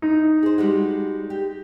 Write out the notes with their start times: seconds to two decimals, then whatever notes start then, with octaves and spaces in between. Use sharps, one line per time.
0.02 D#4
0.43 G#4 C5
0.58 G3 G#3 F#4
1.30 G4